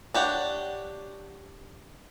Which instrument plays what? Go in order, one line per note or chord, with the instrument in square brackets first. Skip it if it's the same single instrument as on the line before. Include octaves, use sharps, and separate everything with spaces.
[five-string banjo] D4 G4 C#5 F#5